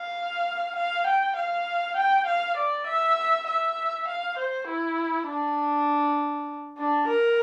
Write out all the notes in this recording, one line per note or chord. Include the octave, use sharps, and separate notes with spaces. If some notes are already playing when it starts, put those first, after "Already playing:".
Already playing: F5
F5
G5
F5
G5
F5
D5
E5
E5
F5
C5
E4
D4
D4
A#4